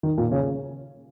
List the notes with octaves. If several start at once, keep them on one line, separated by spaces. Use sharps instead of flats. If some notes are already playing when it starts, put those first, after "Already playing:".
D#3
A#2 A#3
C#3 C#4